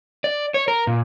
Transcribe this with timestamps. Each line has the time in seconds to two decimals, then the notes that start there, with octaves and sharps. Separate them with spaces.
0.24 D5
0.54 C#5
0.68 A#4
0.87 A#2